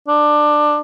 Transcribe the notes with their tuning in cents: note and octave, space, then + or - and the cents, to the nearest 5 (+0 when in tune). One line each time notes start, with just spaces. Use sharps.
D4 +15